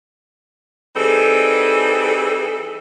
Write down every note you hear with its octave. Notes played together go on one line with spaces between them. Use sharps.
E3 G3 C4 D#4 G#4 A4